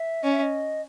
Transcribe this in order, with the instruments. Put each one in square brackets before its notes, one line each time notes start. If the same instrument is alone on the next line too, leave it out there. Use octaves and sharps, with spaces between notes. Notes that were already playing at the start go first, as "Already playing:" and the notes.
Already playing: [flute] E5
[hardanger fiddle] C#4 [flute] D#5
[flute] E5
D#5